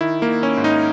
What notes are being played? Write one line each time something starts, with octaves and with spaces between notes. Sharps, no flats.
D#3 E4
A#3
D#3
C#4
G#2
D#4